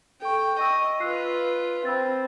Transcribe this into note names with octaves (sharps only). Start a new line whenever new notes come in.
A4 G5 C#6
D#5 C#6 E6
F4 B4 E6 F#6 C7
C4 B5 E6 A6